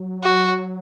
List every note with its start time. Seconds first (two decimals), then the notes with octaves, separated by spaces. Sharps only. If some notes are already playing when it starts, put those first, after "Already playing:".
Already playing: F#3
0.24 F#4